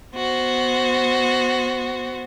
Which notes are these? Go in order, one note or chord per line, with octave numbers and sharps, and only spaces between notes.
B3 F#4 C5